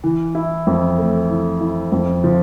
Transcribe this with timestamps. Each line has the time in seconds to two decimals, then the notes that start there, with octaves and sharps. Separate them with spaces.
0.04 E3
0.35 E4
0.67 F2
0.98 A3
1.30 E3
1.61 E4
1.92 F2
2.24 F3